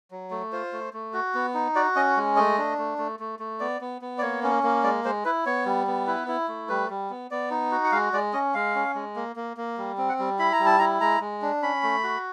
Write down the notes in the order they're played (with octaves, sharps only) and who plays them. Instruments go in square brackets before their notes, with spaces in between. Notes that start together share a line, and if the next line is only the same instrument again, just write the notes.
[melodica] F#3
A3
F4 C5
A3
A3
F#4
B3
D#4
F#4 D5
C#4 D#5
G#3
A3 D#5
D4
A3
A3
A3
A3
B3 D5
B3
B3
D5
A#3 C#5
C#4
A#3
G#3 D5
G#3 C5
E4 B4
B3 C#5
G3
B3
E4 B4
E4
A3
G3 B4
G3
B3
B3 D5
D#4
F#4
F#5
G#3 F5
G#3 D5
C#4 D#5
G#3 F5
C#4
G#3
A#3
A#3
A#3
G3
C4
F#5
G3
E4 B5
A#5
G3
A5
E4 A#5
G#3 A#5
G#3
D4
C#4 B5
A3
F#4